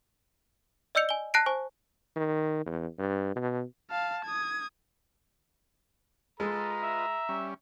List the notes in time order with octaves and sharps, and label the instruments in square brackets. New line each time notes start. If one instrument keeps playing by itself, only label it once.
[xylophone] D5 D#5 E6 G6 C#7 F7
G#5 G7
A5 F#6 A#6 C7 D7
C5 G#5 C#6
[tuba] D#3
E2
G2
B2
[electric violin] F5 A5
D#6 G#6
[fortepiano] G#3 [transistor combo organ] F4 B4 D#5 [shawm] A4 [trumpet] A#5
[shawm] E5
[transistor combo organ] G3 C#4